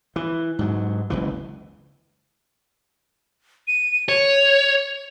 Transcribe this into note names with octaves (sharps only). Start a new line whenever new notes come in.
E3
G#2 F#3
F#1 C#2 E3
D#7
C#5 F7